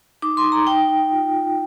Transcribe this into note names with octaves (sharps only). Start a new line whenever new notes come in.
D#4 D6
C6
D#4
A#5
D#4 G5
D#4
F4
F4